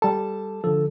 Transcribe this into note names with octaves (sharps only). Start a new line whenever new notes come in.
G3 A4 A5
D3 F3 A4